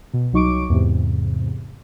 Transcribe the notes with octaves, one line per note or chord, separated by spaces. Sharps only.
B2
C2 F#3 D#4 C#6 D6 D7
E2 G#2 C3